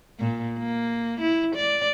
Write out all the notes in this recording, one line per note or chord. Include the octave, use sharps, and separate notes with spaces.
A#2
A#3
E4
D5